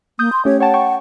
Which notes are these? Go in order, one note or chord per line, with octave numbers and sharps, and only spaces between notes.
A#3 D#6 G6
C6
A3 C#4 G4 C#5
C#5 F#5 G5 A5
G5 C#6